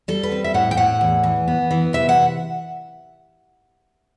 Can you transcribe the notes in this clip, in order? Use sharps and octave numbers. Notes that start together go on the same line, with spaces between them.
G3 A4
B4
C4
E5
A2 F#5
G5
A2 F#5
E2
E3
B3
E3
C3 E5
F#5